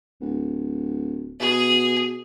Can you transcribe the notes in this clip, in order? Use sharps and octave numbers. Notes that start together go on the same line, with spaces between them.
D1
B2 G#4